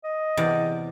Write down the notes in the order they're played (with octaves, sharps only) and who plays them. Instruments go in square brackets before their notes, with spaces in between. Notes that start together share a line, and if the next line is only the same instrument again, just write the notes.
[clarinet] D#5
[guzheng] E2 C3 D5